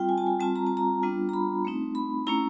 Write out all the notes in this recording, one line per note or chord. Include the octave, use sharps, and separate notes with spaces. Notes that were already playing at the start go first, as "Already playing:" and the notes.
Already playing: G3 C4 F4 G5
G#5
A5
G#5
G3 C4 F4 A5
A#5
A5
A#5
G3 B3 D4 F4
A#5
B5
A3 C4 D#4
B5
A3 C#4 E4 A#5